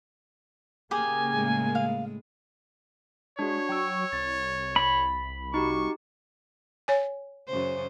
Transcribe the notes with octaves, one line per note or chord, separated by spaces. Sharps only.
C#3 A#3 G4 G#4 G#5 D#6
A2 G#3
F5
G#3 D4 F#4 C#5
F#3 G5 C#6 E6
C2 A6
B5
D#4 F#4 G4 C#6
C#5 G#5
F#2 C#3 C5